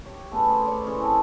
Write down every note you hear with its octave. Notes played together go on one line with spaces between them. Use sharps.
G4 C#5
A3 B3 C#4 G#4
C5
B4 C#5 D5
E3 C#4 G#4 C6
C4 A4 C#5